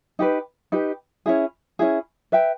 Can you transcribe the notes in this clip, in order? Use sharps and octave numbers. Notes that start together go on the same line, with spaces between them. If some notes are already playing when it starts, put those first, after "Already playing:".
D#4 G4 B4
D#4 G4 B4
C#4 E4 G#4
C#4 E4 G#4
B4 E5 G5